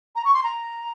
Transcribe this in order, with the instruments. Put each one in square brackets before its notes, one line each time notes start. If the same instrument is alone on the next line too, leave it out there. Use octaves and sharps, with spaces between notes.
[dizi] A#5
C#6
C6
A#5